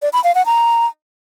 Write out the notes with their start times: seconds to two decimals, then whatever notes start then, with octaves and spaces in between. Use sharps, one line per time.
0.02 D5
0.13 B5
0.24 F5
0.35 F#5
0.46 A#5